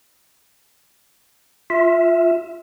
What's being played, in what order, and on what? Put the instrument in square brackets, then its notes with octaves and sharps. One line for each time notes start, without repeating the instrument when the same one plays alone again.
[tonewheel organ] F4 E5